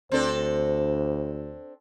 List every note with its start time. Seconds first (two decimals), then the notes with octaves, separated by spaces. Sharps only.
0.12 D2 C4 D4 A4 C5